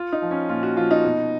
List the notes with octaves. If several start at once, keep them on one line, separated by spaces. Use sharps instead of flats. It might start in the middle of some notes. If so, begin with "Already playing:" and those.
Already playing: F4
D#4
F3
C#4
A#2 F4
F#4
F3 F4
D#4
B2